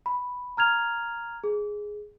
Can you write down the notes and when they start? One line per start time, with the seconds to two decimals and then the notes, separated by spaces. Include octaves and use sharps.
0.06 B5
0.57 A#5 F6 G#6 F7
1.44 G#4